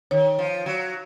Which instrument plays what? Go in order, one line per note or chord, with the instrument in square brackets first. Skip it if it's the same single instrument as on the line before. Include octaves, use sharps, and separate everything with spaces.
[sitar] D#3 [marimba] C#5
[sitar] F3
F#3